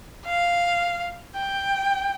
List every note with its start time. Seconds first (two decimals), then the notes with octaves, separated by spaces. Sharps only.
0.25 F5
1.35 G5